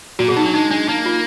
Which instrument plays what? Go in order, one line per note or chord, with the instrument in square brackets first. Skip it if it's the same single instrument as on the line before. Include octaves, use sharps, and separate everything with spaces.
[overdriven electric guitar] A#2 [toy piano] F#4
[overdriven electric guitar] B2 [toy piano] G#4
[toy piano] D#4
[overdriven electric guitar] F#3 [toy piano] D4
[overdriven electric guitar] G#3 [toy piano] D#4
[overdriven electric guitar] G#3 [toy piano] D4
[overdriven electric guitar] A#3 [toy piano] D#4
[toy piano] F4